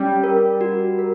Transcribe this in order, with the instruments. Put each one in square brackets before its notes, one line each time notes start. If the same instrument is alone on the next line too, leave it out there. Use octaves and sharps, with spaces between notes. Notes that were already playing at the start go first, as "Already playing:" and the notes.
Already playing: [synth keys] G3 [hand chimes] C#4
[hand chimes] A#4
F#4
A#4